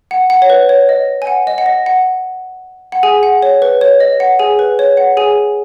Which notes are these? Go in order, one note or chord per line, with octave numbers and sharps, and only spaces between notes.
F#5
F#5
C#5
B4
C#5
D#5
G#5
F#5
D#5
F#5
D#5
F#5
F#5
G#4 G#5
F#5
C#5
B4
C#5
D#5
F#5
G#4 G#5
B4
C#5
F#5
G#4 G#5